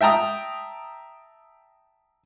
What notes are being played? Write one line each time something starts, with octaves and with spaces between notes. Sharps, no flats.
E5 G5 A5 A#5 D#6